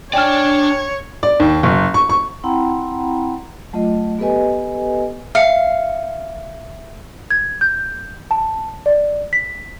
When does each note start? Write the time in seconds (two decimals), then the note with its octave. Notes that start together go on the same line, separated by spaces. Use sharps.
0.13 D4 C#5 D5 G5 G#5 F6
1.23 D5
1.40 D#2
1.63 F#1
1.94 C#6
2.09 C#6
2.44 C4 E4 F#5 G5 A#5 B5
3.73 F#3 A3 F4 D#5
4.19 B3 G4 A4 B4 D#5 G#5
5.35 E5 F5 C#7
7.31 G#6
7.61 G6
8.31 A5
8.86 D5
9.33 B6